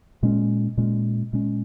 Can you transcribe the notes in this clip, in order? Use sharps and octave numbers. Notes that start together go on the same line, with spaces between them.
A#2 G#3 C#4
A#2 G#3 C#4
A#2 G#3 C#4